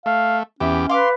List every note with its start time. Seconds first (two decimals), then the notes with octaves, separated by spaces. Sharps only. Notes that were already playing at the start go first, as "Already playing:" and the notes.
0.06 A3 F5
0.60 E2 C#4 G4 E5
0.89 B4 F5 C6 D6